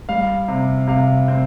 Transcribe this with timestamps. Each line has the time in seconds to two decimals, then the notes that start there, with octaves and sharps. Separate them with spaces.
0.09 G3 F5
0.48 C3
0.87 C3 F5
1.28 C4